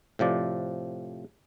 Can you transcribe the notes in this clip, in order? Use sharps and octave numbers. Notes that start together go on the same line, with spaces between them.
A2 C3 F3 D5